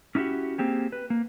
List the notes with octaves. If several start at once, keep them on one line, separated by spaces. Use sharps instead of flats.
C#4 D#4 E4 F#4 G4
A#3 C4 G4 G#4
B4
A#3